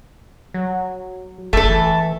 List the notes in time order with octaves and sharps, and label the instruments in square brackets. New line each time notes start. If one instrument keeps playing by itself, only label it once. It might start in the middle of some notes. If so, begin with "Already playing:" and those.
[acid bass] F#3
[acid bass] F#1 [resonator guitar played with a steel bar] A3 A4
[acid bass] E3